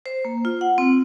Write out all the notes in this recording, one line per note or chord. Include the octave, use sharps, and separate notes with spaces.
C5
A#3
F4
F#5
C4